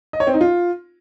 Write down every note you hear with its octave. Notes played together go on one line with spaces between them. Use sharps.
D#5
C#5
C4
D#4
F4